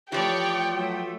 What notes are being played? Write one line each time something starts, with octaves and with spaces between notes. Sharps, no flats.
E3 F3 A3 G4 C#5 D5 G5
F#3 A3